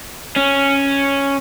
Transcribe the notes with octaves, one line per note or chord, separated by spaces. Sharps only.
C#4